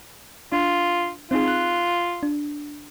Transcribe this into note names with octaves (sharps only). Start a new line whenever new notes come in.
D4 F4
C4 D#4 F4 G#4
F#6
D4